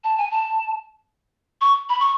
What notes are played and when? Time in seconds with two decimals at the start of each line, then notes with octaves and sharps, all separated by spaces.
0.04 A5
0.18 G#5
0.31 A5
1.61 C#6
1.89 B5
2.00 C#6